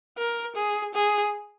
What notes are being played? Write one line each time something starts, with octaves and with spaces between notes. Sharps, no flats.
A#4
G#4
G#4